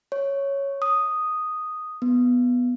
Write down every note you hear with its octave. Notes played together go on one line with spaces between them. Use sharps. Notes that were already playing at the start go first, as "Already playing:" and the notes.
C#5
D#6
B3